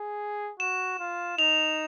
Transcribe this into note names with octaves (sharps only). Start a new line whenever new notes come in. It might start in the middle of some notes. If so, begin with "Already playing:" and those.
Already playing: G#4
F#4 E7
F4
D#4 F7